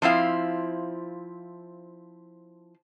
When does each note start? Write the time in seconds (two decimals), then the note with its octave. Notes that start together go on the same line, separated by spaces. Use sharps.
0.02 F3 C4 E4 F5